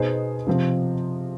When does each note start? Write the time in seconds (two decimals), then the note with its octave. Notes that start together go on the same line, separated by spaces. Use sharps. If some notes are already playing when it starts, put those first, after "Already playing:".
Already playing: B2 B3 D#4 G#4 C5
0.47 C3 F3 C4 F4